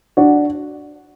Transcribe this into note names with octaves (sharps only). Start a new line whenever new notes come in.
D4 F#4